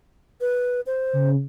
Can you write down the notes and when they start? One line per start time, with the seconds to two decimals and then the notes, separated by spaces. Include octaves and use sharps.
0.41 B4
0.87 C5
1.13 C#3